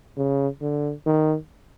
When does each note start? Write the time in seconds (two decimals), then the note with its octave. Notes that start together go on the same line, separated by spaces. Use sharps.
0.17 C#3
0.61 D3
1.06 D#3